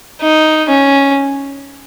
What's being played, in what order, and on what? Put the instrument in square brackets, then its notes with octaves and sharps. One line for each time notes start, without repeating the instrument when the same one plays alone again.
[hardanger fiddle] D#4
C#4